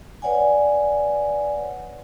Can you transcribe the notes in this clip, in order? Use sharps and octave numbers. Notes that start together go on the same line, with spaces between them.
B4 C#5 D5 F#5 G#5